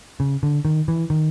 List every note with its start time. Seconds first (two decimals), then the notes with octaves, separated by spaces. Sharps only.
0.20 C#3
0.43 D3
0.65 D#3
0.88 E3
1.10 D#3